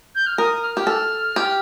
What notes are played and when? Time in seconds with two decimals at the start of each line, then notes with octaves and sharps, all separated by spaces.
0.15 G6
0.26 F6
0.38 A#4 D#6
0.63 F6
0.77 G4
0.87 A4 F6
1.36 G4